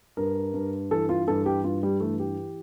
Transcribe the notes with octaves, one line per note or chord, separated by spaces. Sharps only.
G2 A#4
G2
E3 A4
F4
G2 A4
G4
G2 F4
G3
E3 A3
G4